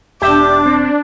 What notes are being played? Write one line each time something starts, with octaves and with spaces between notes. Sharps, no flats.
E1 D4 G4 E5 G5 D6
C4